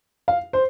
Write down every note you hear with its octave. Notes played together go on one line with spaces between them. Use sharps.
F5
C5